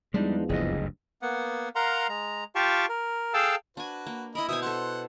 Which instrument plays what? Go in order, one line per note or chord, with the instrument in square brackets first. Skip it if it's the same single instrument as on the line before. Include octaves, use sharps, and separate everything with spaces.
[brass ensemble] E2 F3 [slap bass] G3 [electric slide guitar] G#3 D4 D#4
[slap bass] F#1 D2 G2 [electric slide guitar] G#4 D5 D#5
[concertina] A#3 B3 F#5
A#4 F5 F#5 A#5 C6
G#3 A#5
F4 G4 F5 G5 A5 C#6
A#4
G#4 A4 F5 G5 A5 E6
[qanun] D4 G#5 [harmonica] F#4 B4
[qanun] A#3
[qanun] E4 A#4 [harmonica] D#5 B5
[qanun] B2 C5 G#5 [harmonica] E5 D#6
[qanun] A4 A5 [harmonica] F#5 C6